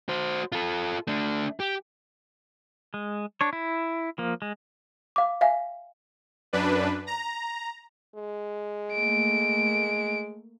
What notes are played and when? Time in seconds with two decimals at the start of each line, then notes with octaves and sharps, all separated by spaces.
0.09 F#4 C5
0.52 F4 A4
1.08 A3 D4
1.60 G4
2.94 G#3
3.41 D4 C#5
3.53 E4
4.18 F3 A#3
4.42 G#3
5.16 F5 D6
5.41 E5 F5 G#5
6.53 F#2 D4 B4
7.07 A#5
8.16 G#3
8.93 A3 A#3 D7